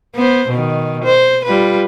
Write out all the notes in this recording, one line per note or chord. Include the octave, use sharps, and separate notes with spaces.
B3 C5
B2 D#3
C5
G3 F4 B4